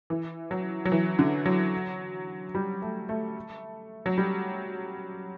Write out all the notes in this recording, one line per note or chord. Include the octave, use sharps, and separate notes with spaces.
E3
F#3
F#3
E3
D3
F#3
G3
A3
A3
F#3
G3